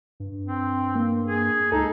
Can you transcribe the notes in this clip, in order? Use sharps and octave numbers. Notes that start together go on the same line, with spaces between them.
G2
C4
A#3
G#4
C#2 D#4 A4